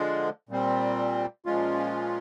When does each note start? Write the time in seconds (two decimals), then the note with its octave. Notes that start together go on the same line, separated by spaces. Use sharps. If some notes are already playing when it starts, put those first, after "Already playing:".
Already playing: D3 F3 G#3
0.49 A#2 G3 C4
1.46 A#2 F3 G#3 C#4 F4